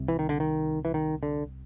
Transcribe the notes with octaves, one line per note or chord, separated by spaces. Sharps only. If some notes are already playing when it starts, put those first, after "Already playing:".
Already playing: C2 C3
E3
D#3
D3
D#3
E3
D#3
D3